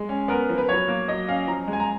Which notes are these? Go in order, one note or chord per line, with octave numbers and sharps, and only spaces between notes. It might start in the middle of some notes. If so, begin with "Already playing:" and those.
Already playing: G#3
C#4
B3 A#4
F3
B4
F#3 C#5
A#3
F#3 D#5
C#4 F5
F3 A#5
G#3
G#5
A#5